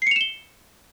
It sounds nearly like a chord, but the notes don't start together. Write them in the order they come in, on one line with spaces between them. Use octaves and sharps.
C7 C#7 F7 E7 G7